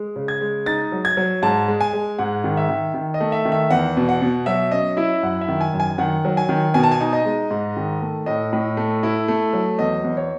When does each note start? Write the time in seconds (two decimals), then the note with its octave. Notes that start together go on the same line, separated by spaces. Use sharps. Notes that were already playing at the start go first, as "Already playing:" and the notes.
Already playing: G#3
0.16 C#3
0.28 G#6
0.41 G#3
0.66 D#4 A6
0.92 F#3
1.05 G#6
1.17 F#3
1.42 G#2 A5
1.68 G#3
1.81 G#5
1.93 G#3
2.18 G#2 F#5
2.44 D#3
2.57 E5
2.69 D#3
2.94 D#3
3.14 D#5
3.20 A3
3.32 E5
3.45 D#3
3.52 E5
3.70 E2 F#5
3.97 B2
4.09 F#5
4.22 B2
4.46 F#3 E5
4.71 C#4 D#5
4.97 E4 E5
5.23 F#2 F#5
5.41 E5
5.48 D#3
5.61 G#5
5.73 F#2
5.80 G#5
5.98 D#3 F#5
6.25 F#3
6.37 G#5
6.49 D#3
6.74 B2 G#5
6.83 A5
6.91 G#5
7.01 D#4
7.13 D#5
7.25 G#3
7.51 G#2
7.77 D#3
8.01 A3
8.26 A2 D#5
8.53 A2
8.77 A3
9.03 E4
9.28 A3
9.53 F#3
9.79 E2 D#5
10.04 E2
10.17 C#5